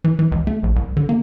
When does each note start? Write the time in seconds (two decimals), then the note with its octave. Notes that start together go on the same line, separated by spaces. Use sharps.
0.04 E3
0.19 E3
0.32 C#2
0.47 A3
0.63 A#1
0.76 C2
0.97 D3
1.09 A#3